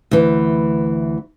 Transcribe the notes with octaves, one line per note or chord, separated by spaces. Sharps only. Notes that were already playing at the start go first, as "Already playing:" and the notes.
D2 E3